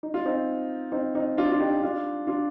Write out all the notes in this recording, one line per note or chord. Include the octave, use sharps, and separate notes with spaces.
D#4
F4
C4 D#4
C4 D#4
C4 D#4
D4 F4
F4
D#4 G4
D4 F4
D4 F4